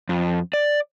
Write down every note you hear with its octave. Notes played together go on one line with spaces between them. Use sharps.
F2
D5